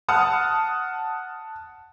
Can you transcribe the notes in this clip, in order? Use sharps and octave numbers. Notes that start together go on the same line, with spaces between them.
F#5 A5 D#6 F6